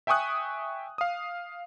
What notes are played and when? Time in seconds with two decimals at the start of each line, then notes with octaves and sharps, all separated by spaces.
0.07 E5 G5 G#5 C#6 D#6 F#6
0.98 F5 D#6